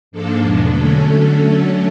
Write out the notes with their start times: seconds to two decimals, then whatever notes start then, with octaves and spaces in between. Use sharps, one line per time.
0.11 G#2 F3 A#3 D4 A4
0.40 E2 B2 G#3 B3 D4
0.68 D3 F#3 A3 C#4 A4